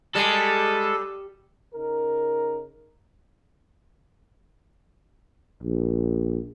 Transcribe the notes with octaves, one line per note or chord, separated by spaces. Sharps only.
G3 G#3 G#4 A4
C#3 D#4 A#4
A#1